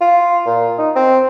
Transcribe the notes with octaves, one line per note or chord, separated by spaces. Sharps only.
F4
A#2
D#4
C4